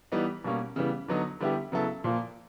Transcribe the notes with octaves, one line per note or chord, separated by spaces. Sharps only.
E3 G3 B3 D#4
B2 G3 A#3 C#4
C#3 E3 G3 B3
D3 F#3 B3 D#4
D3 G3 B3 E4 G4
C#3 F#3 B3 E4 A4
A#2 F3 A#3